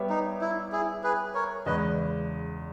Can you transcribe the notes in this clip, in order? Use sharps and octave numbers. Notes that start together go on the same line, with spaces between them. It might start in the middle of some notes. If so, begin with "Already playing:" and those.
Already playing: G3 B3 G4 C#5 E5
D#4
E4
E4 G#4
G#4 B4
A#4 C#5
E2 C#3 G#3 B4 D#5